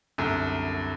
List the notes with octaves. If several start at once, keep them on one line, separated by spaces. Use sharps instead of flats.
C2 F#2 D3